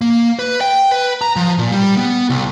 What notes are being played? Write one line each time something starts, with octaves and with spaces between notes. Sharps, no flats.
A#3
B4
G5
B4
A#5
F3
A#2
G3
B3
C2